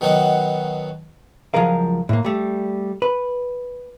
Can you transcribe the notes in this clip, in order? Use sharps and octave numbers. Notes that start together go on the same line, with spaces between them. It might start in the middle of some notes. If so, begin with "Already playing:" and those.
B2 D#3 F#3 B3 F#4
C#2 F3 F#3 G#4 A#4 F5
A2 A#3
G3 A3
B4